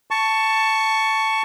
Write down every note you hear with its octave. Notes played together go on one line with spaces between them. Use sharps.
A5 C#6